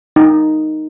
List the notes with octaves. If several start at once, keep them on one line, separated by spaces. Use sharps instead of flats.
D#4